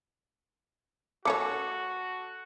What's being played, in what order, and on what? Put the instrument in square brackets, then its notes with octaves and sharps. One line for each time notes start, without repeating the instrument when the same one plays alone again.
[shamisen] A3 C#4 C#5 [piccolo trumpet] F#4 [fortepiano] A4 [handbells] D6 C#7